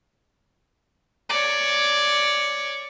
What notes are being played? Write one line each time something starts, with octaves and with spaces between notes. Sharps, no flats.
C#5 D5